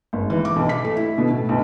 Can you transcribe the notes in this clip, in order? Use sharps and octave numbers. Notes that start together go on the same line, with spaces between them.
G#1
E3
D6
B1
B6
A3
E4
B2
A2
B1